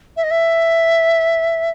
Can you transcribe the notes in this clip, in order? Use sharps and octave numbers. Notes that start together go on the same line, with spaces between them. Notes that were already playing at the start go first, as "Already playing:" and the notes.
E5
D#5
E5